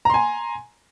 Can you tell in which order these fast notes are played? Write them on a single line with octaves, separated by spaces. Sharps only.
A#5 C6 G#5